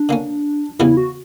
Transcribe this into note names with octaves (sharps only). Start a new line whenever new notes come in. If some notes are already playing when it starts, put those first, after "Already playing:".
Already playing: D4
D3 A#3 C#4
E2 C#3 E3 G3 B3 E4
F#4